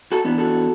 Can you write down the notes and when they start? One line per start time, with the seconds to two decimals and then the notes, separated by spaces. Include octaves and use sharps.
0.12 F#4 A4
0.25 E3 B3 D4
0.38 F#4 A4